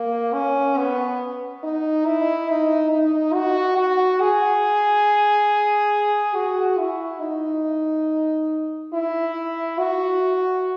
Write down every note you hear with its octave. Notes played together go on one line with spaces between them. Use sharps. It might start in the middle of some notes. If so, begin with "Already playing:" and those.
Already playing: A#3
C#4
B3
D#4
E4
D#4
D#4
F#4
F#4
G#4
F#4
E4
D#4
E4
F#4